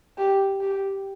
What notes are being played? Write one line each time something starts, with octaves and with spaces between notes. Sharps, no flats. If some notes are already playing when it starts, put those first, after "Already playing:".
G4
G4